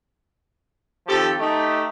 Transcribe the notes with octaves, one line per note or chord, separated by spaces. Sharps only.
D#3 F3 C4 G4 A4
A3 D#4 G4